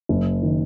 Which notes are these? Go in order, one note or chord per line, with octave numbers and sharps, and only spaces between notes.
F#1
D#3